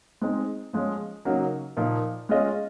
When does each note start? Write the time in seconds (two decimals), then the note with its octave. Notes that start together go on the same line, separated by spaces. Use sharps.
0.21 G#3 C4 D#4
0.73 F3 G#3 C#4
1.25 C#3 F#3 A#3 D#4 F#4
1.77 A#2 F3 A#3 D#4
2.29 G#3 C#4 F4 G#4 D#5